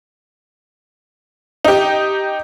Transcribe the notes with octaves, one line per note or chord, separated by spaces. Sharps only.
D#4 G4